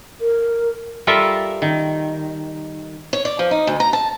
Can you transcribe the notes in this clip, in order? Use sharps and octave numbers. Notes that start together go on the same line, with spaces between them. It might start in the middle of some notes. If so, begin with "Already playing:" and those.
A#4
G3 F4 A4 A#4 E5
D#3
C#5
D5
F3
D#4
D2
A#5
A5